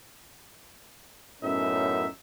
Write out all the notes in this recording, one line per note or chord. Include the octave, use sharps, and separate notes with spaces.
F#2 A2 B3 C#4 D#4 E5